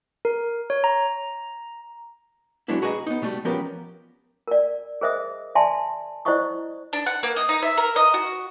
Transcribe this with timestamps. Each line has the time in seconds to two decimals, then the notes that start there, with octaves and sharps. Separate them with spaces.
0.25 A#4
0.70 C#5
0.84 A#5
2.68 F#3 G#3 A3 B3 D4 E4
2.82 F#4 G#4 B4 D#5 F5 A#5
3.06 B3 D#4
3.22 B2 G3 A3
3.45 F3 B3 C#4 G4 A#4 B4
4.47 A#4 D5
5.01 G#4 A#4 C5 D#5 E5 D#6
5.55 D5 E5 G#5 A5 C6
6.25 E4 C5 D5 D#5 C#6 D#6
6.93 D4
7.07 F#5
7.23 A#3
7.36 D#5
7.49 D#4
7.63 E5
7.78 A#4
7.96 D#5
8.14 F#4